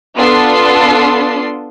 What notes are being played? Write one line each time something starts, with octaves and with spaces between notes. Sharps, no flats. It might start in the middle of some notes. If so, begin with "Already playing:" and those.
B3 D4 F4 A4 C6 C7